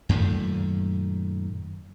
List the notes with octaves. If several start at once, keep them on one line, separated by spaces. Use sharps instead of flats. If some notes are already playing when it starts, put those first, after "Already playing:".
F#2 A#2 D#3 A3